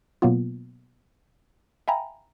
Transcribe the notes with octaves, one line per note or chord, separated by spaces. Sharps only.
B2 F#3 A#3 B3 F4
E5 F5 G5 G#5 A#5 B5